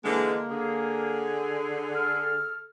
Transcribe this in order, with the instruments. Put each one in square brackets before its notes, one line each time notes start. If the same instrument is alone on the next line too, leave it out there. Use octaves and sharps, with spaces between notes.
[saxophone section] D3 E3 G#3 [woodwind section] A#3
[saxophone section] D3 G#4
[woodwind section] A4 F6